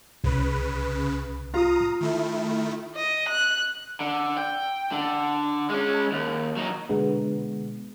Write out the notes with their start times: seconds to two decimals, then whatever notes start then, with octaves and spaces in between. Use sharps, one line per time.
0.24 C2 C#3 B4
1.54 F4 A#5 D#6
2.01 D#3 A3 E4
2.96 D#5
3.28 F#6
4.00 D3
4.37 G5
4.92 D3
5.70 G#3 C#4
6.12 D#2
6.57 F#3 D#4
6.89 B2 D3 G#3 B3